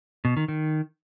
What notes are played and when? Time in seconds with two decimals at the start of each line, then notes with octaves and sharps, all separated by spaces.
0.25 B2
0.37 D#3
0.48 D#3